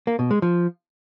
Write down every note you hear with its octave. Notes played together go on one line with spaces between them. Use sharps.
A#3
B2
G#3
F3